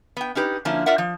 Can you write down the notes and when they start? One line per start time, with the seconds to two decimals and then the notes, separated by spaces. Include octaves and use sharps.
0.17 B3 G5
0.35 C#4 D#4 G4 B4
0.65 D3 F3 A#3 C#4 E4
0.86 F4 A#4 D5 E5 F#5
0.98 F3